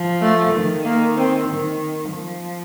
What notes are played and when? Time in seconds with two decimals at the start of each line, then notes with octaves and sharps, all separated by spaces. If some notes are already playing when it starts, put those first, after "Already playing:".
Already playing: F3
0.22 A3
0.54 D#3
0.85 A#3
1.17 C4
1.48 D#3
2.11 F3